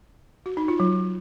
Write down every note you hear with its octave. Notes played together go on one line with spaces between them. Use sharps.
F#4
D#4
F4
F#3